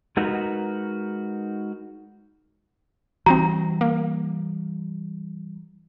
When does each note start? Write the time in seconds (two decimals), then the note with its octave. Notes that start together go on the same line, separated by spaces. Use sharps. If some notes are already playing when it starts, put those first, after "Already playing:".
0.17 G#3 D#4 F#4 A#4 B4
3.26 E3 G3 C4 D#4 F#4 A#5
3.81 A#3